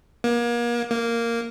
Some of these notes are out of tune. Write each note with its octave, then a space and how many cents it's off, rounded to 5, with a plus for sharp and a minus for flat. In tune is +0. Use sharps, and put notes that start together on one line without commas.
A#3 +35
A#3 -5